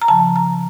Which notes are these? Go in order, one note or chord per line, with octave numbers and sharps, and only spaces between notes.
A#5
C#3 F3 A5
A#5